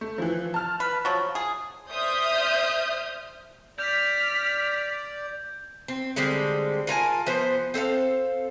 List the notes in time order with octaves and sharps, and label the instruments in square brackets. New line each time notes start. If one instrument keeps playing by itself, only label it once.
[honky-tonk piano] A3
E3 F3
A5 F6
[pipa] B4
F3 F#3
G#4
[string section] C5 D5 E5 D#6 F6 G6
[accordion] D5 [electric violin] F6 B6 [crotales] G6
[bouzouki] C4
D3 G3 G#3 C4
F4 A#4 G#5 A5
F3 B3 C5
C4 A4 C5 F5